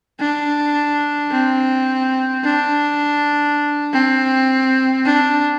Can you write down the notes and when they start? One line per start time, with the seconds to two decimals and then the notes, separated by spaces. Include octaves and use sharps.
0.19 D4
1.31 C4
2.44 D4
3.93 C4
5.05 D4